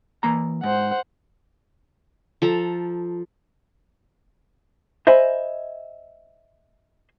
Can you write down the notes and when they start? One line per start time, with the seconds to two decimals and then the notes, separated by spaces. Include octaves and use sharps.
0.23 E3 A#3 A#5
0.63 G#2 C5 F#5
2.42 F3 A4 A#5
5.07 C5 D#5 E5 G#5 B5